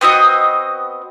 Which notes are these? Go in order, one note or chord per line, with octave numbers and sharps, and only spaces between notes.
B3 C4 F#4 D#5